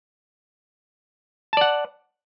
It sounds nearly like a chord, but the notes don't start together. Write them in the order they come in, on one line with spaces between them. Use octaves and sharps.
A5 D5 F#5